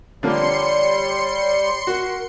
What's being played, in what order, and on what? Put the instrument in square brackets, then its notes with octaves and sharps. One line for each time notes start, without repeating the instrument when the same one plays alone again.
[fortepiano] D3 F3 A#3 [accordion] G3 [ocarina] C#5 [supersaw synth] C6 C#7
[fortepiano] F#4 [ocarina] A#4